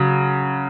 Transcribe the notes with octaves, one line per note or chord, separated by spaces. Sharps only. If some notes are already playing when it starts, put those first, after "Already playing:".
Already playing: C#3 F#3